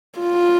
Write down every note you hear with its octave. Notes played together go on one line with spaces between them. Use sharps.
F4